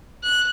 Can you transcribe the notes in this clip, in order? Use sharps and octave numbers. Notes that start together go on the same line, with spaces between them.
F#6